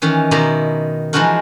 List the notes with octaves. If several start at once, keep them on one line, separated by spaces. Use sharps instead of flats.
D#3 E3 C#4
B2 D#3 E4 D5 A#5 C6
E3 F3 G#3 D#4 F#4 A#4